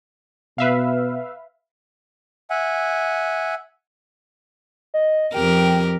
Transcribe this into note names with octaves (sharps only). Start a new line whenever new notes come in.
B2 B4 E5 F5
E5 F#5 G#5
D#5
F2 G4 A#4 G5